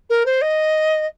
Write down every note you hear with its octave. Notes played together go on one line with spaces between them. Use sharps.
A#4
C5
D#5